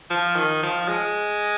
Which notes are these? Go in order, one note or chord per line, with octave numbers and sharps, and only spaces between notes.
F3
D#3
F3
G#3